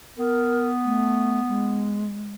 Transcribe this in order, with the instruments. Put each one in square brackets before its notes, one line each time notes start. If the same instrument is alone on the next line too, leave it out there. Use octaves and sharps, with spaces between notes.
[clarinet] B3 [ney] A#4
[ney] A3
G#3